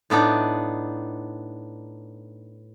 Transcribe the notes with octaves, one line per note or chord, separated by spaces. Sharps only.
A2 B3 D4 D#4